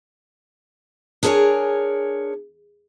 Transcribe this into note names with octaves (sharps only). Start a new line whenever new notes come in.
D4 G#4 A#4 B4 C#5 G#5